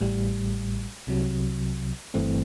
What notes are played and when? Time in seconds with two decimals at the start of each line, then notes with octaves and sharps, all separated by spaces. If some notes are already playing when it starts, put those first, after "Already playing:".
0.01 A1 A2 G3
1.07 C2 C3 F#3
2.14 G1 G2 E3 A3 C4